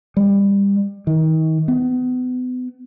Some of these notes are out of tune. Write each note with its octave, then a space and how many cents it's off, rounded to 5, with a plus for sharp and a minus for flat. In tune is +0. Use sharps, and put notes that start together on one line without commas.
G3 +25
D#3 +35
B3 +30